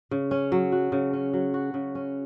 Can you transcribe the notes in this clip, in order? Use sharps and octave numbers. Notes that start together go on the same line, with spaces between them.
C#3
C#4
F#3
F#4
C#3
C#4
F#3
F#4
C#3
C#4